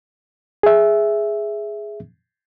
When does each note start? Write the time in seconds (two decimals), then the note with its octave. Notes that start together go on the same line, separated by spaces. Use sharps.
0.63 G#4 E5